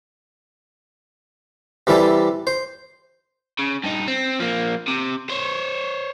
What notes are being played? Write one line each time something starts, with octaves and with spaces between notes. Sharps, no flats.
C3 E3 G3 A4
C5
C#3
G2 D#4
C4
F3 A#3
C3
C5 C#5